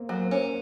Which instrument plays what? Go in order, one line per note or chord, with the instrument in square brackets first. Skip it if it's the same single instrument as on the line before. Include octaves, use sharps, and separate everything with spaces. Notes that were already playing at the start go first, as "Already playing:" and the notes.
Already playing: [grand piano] A#3 C4
[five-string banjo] F#3
[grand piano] A#3
C4
[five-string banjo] C#4